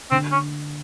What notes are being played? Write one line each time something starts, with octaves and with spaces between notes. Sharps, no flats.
D3 C4
C#4